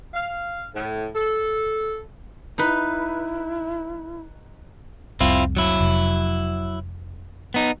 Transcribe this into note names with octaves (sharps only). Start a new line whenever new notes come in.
F5
A2
A4
D#4 E4 B4
F1 C2 C3 C4 E4 F4
F#3 E4
F1
B3 D#4